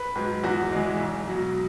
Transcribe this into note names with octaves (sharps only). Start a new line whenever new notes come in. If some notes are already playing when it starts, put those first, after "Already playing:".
Already playing: B4
G#2 F#3
E2 F#4
E3 G#3
B1
B2 F#3